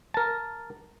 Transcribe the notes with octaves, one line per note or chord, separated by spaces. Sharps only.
A#4 A5